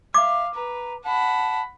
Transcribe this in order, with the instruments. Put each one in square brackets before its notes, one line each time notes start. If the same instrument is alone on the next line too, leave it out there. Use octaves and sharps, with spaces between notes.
[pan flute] E5 [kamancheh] F5 [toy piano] D6
[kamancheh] B4 [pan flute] A#5
[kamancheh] F#5 B5 [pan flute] A5